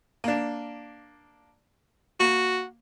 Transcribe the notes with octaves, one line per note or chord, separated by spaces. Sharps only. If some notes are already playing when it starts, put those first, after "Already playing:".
A#3 D4
A#3 F#4